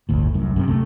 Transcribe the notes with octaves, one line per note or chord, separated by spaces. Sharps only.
G1 D2 A2
C2 F#2
F#2 A2 C3
C3 A3